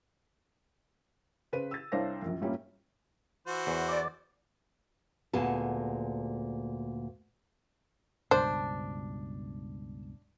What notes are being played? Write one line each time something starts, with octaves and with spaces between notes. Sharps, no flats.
C#3 B4 C5 D#7
E6 A6
C2 D4 C5 C#5 F5 A#6
A#1 F#2
G2 A#2 G3 A#3 C#4 E4
E3 F#4 C5
E2
D5
D2 A#2 B3 G#4 A5
C#2 G2 B2 D4 C5